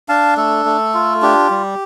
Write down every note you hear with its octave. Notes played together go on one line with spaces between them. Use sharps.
D4 F5 A5
A3 A4
A3
F4
D4 G4
G3